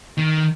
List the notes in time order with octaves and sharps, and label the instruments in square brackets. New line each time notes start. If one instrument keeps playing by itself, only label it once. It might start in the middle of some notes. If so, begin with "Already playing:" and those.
[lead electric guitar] D#3